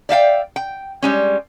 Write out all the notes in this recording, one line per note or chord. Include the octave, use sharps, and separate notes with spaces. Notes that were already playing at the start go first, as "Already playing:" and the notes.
D5 E5 F5 G5
G5
G3 G#3 C#4